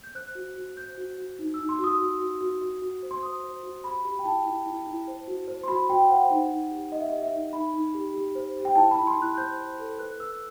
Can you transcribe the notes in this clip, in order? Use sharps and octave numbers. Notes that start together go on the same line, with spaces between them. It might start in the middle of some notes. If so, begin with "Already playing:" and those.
G6
C5 F#6
F#4
F#4
C5 G6
F#4
F#4
D#4
E6
D#4
C6
F#4 D#6
F#4
F#4
F#4
F#4
F#4
C5
C6
C5 D#6
C5
F#4
G4 B5
G4 B5
G5
E4 A5
E4
E4
E4
C5
F#4
C5
C6
F#4 B5
F#4 G5
C5 F#5
D#4
D#4
G4
D#4 D#5
E5
G4 D#5
E5
D#4
D#4 B5
D#4
G4
G4
C5
G4
G5
E4 A5
B5
E4
C6
E4
F#6
C5 G6
C5
A4
B4 F#6
B4 E6